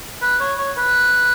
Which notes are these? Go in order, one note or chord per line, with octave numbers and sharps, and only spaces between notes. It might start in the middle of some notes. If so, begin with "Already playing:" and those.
B4
C#5
C#5
B4